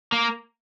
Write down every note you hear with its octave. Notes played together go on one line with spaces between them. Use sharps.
A#3